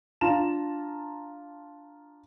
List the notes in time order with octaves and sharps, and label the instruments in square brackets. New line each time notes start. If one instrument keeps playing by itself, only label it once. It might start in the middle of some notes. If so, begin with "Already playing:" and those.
[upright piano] D4 F4 A5 A#5 E7